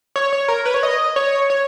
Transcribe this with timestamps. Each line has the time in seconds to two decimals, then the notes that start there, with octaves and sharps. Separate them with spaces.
0.16 C#5
0.33 C#5
0.48 A#4
0.65 B4
0.74 C#5
0.83 D#5
1.16 C#5
1.50 C#5